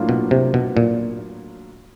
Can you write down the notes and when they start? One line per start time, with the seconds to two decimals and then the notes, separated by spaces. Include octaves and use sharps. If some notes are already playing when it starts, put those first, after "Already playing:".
Already playing: A2 F#3 A#3 D4 F4
0.09 B2
0.31 C3
0.54 B2
0.77 A#2